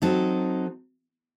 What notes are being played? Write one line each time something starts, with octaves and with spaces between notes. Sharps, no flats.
F#3 C4 D#4 A4